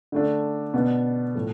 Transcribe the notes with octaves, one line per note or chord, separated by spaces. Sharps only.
D3 A3 D4
B2 B3 D4
A2 F3 A3